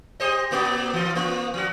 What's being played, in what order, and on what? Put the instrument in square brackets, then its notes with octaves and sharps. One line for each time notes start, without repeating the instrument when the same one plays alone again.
[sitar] G4 C5 D#5
A#2 A#3 F#4
E3 F4
A#3 F4
F3 F#4